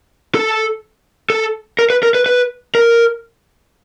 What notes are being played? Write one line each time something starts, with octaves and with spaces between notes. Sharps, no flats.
A4
A4
A#4
B4
A#4
B4
B4
A#4